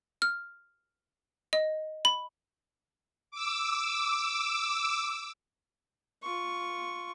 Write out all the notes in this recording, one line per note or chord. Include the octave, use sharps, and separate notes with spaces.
F6
D#5
B5
D6 E6
F4 C#6